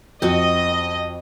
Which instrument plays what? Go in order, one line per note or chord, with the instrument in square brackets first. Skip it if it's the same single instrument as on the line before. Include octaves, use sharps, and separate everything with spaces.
[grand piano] F2 [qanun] C4 F#4 [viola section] D#5